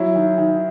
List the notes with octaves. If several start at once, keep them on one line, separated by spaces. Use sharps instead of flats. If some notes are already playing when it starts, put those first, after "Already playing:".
Already playing: F#3 E4
D#3
D#3